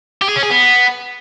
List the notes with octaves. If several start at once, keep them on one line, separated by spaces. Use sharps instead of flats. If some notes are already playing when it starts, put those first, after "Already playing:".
G4
G#4
C#4
G#4
B3